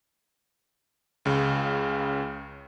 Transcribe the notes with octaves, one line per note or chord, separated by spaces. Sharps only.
C#2 C#3